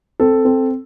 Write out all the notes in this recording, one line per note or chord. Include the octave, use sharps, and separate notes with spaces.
C4 A4
C4